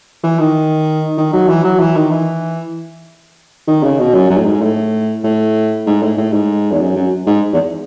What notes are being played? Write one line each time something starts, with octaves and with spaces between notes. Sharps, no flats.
E3
D#3
D#3
F#3
E3
F#3
E3
D#3
E3
D#3
C#3
B2
F#2
F#2
A2
G#2
A2
A2
G#2
A2
A2
G#2
E2
F#2
F#2
G#2
E2